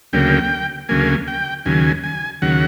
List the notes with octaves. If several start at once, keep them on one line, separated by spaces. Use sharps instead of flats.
D2 C#3 F#3 A#3 G5
D2 C#3 F#3 A#3 G#5
G5
D#2 C#3 F#3 G#5
G#5
D#2 C#3 F#3 F#5